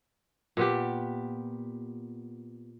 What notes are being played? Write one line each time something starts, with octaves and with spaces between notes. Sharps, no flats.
A#2 B3 G4